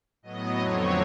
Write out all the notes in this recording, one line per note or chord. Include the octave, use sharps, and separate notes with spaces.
A2 F#3 B3 D#5
F2 D3 F#3 A3 C4 C#5